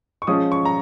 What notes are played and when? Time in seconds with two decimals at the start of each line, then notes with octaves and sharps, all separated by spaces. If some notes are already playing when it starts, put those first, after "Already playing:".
0.22 C#6
0.27 F3 G#3 C#4 F4 D#6
0.52 C#6
0.65 A#5